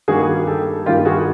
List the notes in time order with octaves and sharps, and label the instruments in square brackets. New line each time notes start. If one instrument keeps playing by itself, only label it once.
[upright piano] G2 D#3 G3 A#3 F#4 G#4
G4 A4
G2 D#3 G3 A#3 F4 G4
F#4 G#4